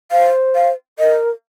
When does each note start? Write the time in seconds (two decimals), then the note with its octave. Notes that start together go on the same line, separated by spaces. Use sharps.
0.11 C5 F5
0.55 F5
0.99 A#4 D#5